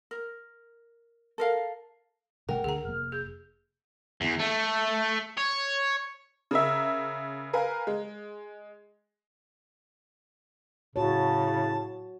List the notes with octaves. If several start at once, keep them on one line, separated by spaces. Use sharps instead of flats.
A#4
A4 A#4 F5
B2 G3 A3 A#4 F#5 G5
D2 G#4 A#5
F1 A#3 F6
G#4 G6
E2
A3
C#5
C#3 A#4 E5
A#4 B4 F5 G#5
G#3
A2 C#3 F#4 C#5 A5